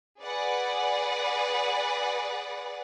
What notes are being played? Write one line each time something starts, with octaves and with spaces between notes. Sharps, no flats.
G#4 B4 D5 F#5